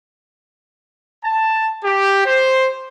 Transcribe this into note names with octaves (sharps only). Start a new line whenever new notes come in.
A5
G4
C5